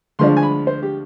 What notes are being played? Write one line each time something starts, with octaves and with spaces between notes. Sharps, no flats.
D2 D3 F3 G#3 D4 C6
G#5
B5
C5
G4